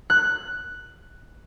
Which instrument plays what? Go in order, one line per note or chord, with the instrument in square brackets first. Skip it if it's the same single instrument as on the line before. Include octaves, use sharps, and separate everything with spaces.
[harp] F#6